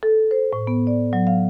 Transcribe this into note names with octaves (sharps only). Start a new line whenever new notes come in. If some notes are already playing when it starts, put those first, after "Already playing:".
A4
C5
A2
B3
D5
F#3
F5